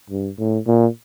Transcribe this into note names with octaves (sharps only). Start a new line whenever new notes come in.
G2
A2
A#2